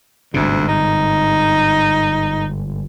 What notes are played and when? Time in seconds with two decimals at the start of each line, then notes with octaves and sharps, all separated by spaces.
0.34 G1 D2 G#2 C3
0.68 D#4